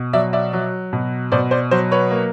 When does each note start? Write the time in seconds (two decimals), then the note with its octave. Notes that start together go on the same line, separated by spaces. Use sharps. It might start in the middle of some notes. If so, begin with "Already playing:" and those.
Already playing: B2
0.13 F#3 D5 E5
0.33 D5 E5
0.53 F#3
0.93 B2
1.32 B2 C5 D5
1.51 C5 D5
1.71 F#3 C5
1.92 B4 C#5
2.11 A#3